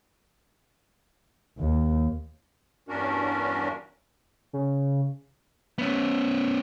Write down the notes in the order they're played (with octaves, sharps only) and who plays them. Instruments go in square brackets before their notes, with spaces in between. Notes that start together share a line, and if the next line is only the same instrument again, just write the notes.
[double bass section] D#2
[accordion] E2 G2 C#4 D4 F#4 A#4
[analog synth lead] C#3
[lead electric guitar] B3 C#4